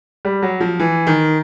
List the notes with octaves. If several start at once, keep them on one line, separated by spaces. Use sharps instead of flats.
G3
F#3
F3
E3
D#3